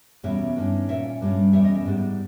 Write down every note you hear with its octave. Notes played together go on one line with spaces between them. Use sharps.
E2 B2 G3 A#3 C#4 E5
G2 D#3 A#3 C#4
A#2 A#3 C#4 E5
G2 G3 A#3 C#4
E2 B2 G3 C#4 E5
D#5
E5
G#2 G3 B3